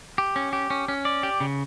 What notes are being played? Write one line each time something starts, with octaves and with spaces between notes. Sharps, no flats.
G4
C#4
G4
C#4
C#4
D5
G4
C#3